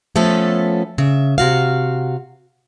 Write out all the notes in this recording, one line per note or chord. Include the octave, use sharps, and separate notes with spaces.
F3 A3 B3 C#4 A4
C#3 E5
C3 F#4 F5